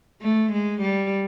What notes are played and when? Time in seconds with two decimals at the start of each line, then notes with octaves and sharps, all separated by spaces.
0.22 A3
0.52 G#3
0.81 G3